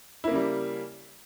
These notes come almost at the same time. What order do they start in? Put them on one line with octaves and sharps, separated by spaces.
E4 A#3 C#3 G3